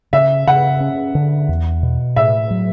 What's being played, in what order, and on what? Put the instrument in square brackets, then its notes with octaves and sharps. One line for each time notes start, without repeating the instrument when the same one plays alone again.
[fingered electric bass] C#3 [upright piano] E5
[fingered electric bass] C#3 [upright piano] F#5
[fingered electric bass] C#4
D3
E2
B2
[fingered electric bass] A2 [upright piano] E5
[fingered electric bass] F#3